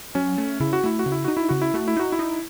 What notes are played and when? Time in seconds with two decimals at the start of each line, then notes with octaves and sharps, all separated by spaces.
0.15 F#3 C#4
0.38 A3
0.60 C#3 E4
0.73 F#4
0.84 A3 E4
0.99 F#4
1.06 C#3
1.12 E4
1.24 D#4 F#4
1.37 E4
1.49 C#3 F#4
1.62 E4
1.74 A3 F#4
1.88 E4
1.97 D#4 F#4
2.12 E4
2.19 D#4